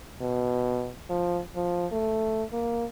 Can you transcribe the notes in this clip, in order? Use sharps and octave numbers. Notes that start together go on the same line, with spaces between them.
B2
F3
F3
A3
A#3